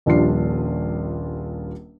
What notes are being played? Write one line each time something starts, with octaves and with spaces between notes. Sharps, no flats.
D#1 A#1 G3 D4 F4 C7